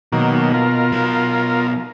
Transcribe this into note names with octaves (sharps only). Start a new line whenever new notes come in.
B2 D#3 F#3 A#3
F4 A#4
B2 F#3